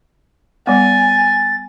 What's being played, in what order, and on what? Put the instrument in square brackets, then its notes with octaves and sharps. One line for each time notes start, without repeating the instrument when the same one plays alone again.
[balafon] G3 B3 [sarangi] G#5 [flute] A6